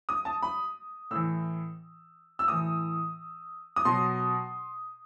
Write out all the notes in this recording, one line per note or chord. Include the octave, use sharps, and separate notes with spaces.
D#6
A5
B5
A2 E3 E6
E6
A2 E3 D#6
D#6
B2 F#3 C6